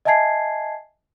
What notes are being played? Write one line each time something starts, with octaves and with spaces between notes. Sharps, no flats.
D#5 E5 G#5 A5 G#6 C7